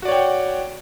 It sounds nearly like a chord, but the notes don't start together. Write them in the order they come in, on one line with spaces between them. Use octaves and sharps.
F#4 D5 C#5 G5 F#5